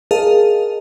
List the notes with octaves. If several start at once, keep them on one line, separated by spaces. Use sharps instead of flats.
G#4 A#4 D#5 F5 A5